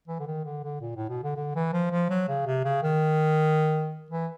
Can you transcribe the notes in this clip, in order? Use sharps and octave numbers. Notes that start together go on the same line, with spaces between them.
E3
D3
D#3
D3
D3
A#2
A2
B2
D3
D3
E3
F3
F3
F#3
C#3
C3
C#3
D#3
E3